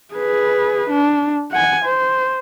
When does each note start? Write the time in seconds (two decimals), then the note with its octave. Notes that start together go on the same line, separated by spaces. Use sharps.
0.14 G#4 B4
0.90 D4
1.52 F#5 G#5
1.85 C5